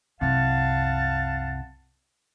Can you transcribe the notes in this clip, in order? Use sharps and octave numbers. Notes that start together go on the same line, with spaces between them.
C2 F#2 C3 F5 F#5 A5